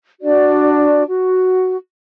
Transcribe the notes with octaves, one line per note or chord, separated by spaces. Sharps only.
D4 F#4 D5
F#4